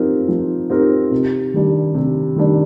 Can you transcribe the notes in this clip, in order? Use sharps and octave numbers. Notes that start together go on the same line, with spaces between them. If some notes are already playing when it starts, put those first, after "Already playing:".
Already playing: F3 C4 D#4 G4 A#4
F3
C4 D#4 G4 A#4
C3
D#3 G3 D4
C3
D#3 G3 D4